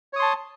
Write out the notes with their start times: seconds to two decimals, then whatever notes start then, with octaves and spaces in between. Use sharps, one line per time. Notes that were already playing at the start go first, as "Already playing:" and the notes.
0.13 C#5
0.16 D#6
0.19 C6
0.22 A5